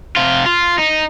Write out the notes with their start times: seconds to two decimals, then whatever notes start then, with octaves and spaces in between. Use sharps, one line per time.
0.16 C3 F4
0.46 F4
0.78 D#4